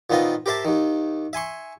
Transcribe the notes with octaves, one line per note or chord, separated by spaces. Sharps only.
A#2 D#3 B3 C4 F4 D#5
G4 A#4 C5 E5 A5
D#2 D#3
E5 G#5 C6 C#6